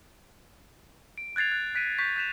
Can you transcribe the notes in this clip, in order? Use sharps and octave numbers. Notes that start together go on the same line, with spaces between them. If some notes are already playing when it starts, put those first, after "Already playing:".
D7
F#6 G#6 A6 C7 F7
F#6
F#6 B6 D7 D#7
C#6 G6 B6
F#6 G6 B6 E7 F7